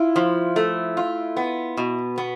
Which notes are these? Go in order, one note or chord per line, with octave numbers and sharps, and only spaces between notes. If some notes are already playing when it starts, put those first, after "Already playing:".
Already playing: E4 F4
F3
A3
F4
B3
B2
B3